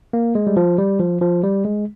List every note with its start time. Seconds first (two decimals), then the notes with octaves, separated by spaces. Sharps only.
0.13 A#3
0.35 G#3
0.47 G3
0.57 F3
0.78 G3
1.00 F3
1.21 F3
1.43 G3
1.65 G#3